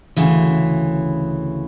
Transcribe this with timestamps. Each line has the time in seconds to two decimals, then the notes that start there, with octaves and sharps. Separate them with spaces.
0.16 D2 C#3 E3